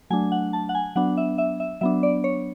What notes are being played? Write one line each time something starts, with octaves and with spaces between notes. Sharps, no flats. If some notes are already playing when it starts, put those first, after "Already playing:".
F#3 A3 D4 G#5
F#5
A5
F#5
G#5
F#3 B3 D4 F#5
E5
E5
E5
F#3 B3 D4 E5
D5
C#5